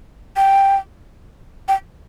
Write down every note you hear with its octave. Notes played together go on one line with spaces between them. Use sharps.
G5
G5